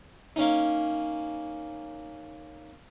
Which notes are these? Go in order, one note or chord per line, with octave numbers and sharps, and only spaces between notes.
A#3 C#4 D#4